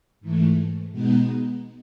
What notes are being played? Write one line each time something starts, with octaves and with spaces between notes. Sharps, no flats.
G#2 E3 A3
B2 G#3 B3 D#4